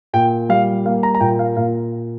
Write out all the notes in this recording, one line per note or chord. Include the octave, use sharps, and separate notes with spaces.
A#2 G5
G3 F5
A#3 F5
A#5
A#5
A#2 G5
F5
A#2 F5